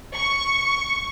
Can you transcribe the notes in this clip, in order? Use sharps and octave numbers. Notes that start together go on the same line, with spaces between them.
C#6